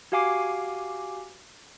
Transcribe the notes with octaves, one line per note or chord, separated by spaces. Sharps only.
F#4 G4 F5 G#5 D6 C7